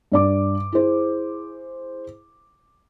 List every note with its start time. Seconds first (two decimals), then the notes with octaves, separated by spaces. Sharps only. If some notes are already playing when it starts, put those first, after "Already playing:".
0.12 G2 D5 D6
0.72 E4 G#4 C5